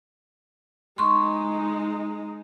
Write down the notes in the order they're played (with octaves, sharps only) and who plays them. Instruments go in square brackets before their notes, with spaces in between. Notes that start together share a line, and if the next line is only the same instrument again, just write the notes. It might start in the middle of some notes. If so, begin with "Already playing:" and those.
[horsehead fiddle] G#3 D#4 [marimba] C6 C#6